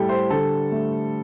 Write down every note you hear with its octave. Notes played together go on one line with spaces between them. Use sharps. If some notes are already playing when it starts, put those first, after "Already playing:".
Already playing: A2 G3 G4 A4
C5
D3 A4
A3